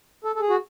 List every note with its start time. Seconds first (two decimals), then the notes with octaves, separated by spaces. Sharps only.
0.24 A4
0.35 A4
0.40 G#4
0.50 F#4